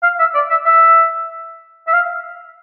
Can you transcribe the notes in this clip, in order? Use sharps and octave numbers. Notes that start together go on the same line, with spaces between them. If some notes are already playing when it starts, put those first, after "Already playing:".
F5
E5
D5
E5
E5
E5
F5